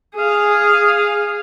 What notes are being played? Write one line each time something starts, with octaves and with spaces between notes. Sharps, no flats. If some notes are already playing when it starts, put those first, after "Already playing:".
G#4 F5